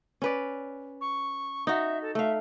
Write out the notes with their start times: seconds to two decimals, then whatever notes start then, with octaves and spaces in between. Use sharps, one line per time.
0.22 C#4 B4 D5
1.00 C#6
1.67 D#4 F#4 E5
2.01 A4
2.15 A3 E5 F5